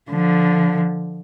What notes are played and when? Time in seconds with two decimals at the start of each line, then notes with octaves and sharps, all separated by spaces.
0.11 D3 F3